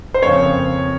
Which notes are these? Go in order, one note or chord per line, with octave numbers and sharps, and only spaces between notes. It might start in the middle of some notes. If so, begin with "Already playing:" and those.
C5
F2 C#3 F3 A#3 C#5